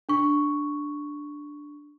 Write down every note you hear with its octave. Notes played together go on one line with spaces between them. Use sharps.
D4 C#6